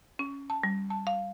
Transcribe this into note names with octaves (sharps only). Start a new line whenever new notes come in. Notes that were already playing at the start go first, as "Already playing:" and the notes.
C#4
A5
G3
A5
F5